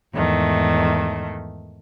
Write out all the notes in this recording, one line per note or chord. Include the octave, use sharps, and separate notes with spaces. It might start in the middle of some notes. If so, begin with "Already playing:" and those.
E2 G#2 D#3 A3